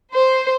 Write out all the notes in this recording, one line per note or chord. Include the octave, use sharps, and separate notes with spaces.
C5